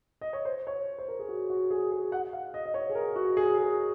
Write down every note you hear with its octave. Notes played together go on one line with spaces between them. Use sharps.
D#5
C#5
C5
C#5
C5
A#4
G#4
F#4
F#4
G#4
G#4
F#5
F5
D#5
D#5
C#5
G#4
A#4
F#4
G#4
G#4